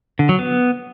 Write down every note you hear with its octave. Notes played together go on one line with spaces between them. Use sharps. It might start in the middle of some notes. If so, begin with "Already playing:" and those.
D3
F#3
B3